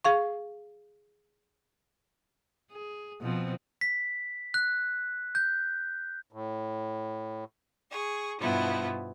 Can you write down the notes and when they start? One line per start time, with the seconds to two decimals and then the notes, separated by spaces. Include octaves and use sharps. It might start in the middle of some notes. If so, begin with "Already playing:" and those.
0.05 G#4 F5 C#6
2.72 G#4
3.21 B2 F3 C4
3.81 B6
4.54 F#6
5.35 G6
6.33 A2
7.90 G#4 C#6
8.40 G2 B2 F3 B3 E4